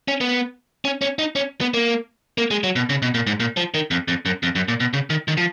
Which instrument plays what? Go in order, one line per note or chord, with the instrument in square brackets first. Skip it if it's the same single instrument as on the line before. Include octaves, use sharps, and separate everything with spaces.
[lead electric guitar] C#4
B3
C#4
C#4
D#4
C#4
B3
A#3
A#3
G#3
F#3
B2
C#3
B2
A#2
G#2
A#2
F3
D#3
F2
F2
F#2
F2
F#2
A#2
B2
C#3
D#3
D#3
F3